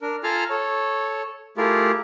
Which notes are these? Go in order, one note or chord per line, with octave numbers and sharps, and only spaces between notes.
D4 A#4
F4 A4 F5 G#5 A#5 F6
A4 C#5
A3 E4 F4 G4 G#4 A#4